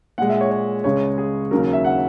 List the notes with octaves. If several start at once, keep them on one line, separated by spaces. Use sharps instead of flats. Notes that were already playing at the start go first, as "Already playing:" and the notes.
A#2 G#3 F#5
E5
C#5
C#5
C#2 C#3 G#3 C#5
G#4
D#2 C#3 F#3 A#4
E5
F#5